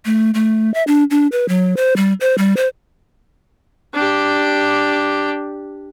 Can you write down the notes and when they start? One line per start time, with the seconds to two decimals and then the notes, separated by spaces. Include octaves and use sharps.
0.05 A3
0.34 A3
0.74 E5
0.87 D4
1.11 D4
1.32 B4
1.48 F#3
1.77 C5
1.97 G3
2.20 C5
2.38 G3
2.57 C5
3.94 D4 G4